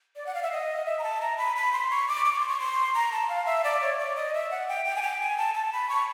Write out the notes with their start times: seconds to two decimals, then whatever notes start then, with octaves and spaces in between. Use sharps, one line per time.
0.16 D5
0.26 F#5
0.34 F5
0.43 E5
0.51 D#5
0.86 E5
0.99 A#5
1.03 A5
1.21 A#5
1.38 B5
1.56 B5
1.72 C6
1.90 C#6
2.08 D6
2.25 D6
2.32 C#6
2.40 C6
2.49 C#6
2.60 C6
2.94 A#5
3.12 A5
3.29 F5
3.46 E5
3.64 D5
3.81 C#5
3.98 D5
4.16 D#5
4.34 E5
4.51 F#5
4.68 G5
4.85 G5
4.96 G#5
5.02 G5
5.21 G#5
5.38 A5
5.54 A5
5.73 B5
5.89 C#6